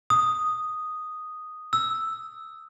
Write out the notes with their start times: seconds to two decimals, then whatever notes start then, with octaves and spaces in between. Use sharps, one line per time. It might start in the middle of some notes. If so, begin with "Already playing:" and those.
0.10 D#6
1.73 E6